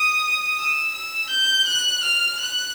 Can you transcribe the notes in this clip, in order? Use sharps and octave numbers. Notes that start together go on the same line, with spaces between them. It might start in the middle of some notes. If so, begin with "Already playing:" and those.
Already playing: D#6
E6
E6
G6
F#6
F6
F#6